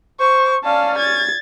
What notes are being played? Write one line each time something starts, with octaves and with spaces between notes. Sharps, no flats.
C5 C#6
C#4 D5 F5 A5
G#6 A6